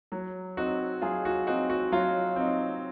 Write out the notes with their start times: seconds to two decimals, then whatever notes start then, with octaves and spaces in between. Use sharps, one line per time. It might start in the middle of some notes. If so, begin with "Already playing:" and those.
0.12 F#3
0.57 C4 D#4 F#4
1.02 F#3 F4 G#4
1.25 F#4
1.47 C4 D#4 F#4
1.70 F#4
1.92 F#3 F4
2.36 C4 D#4